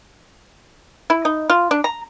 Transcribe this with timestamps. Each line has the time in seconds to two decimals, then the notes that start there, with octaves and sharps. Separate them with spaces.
1.10 E4
1.25 D#4
1.50 F4
1.71 D4
1.84 A#5